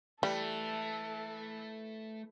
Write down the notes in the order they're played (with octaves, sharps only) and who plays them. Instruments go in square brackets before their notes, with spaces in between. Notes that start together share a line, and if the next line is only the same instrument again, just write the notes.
[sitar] E3 [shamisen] G3 [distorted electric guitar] A3 [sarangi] A4